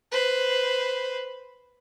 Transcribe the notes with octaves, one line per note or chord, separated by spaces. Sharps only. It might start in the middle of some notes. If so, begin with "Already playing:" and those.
B4 C5